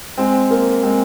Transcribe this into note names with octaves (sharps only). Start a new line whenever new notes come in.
G#3 C4
A#3
G#3 C4